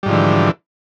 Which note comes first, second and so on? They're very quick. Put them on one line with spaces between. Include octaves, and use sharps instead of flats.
G3 G#2 F3 D3 E3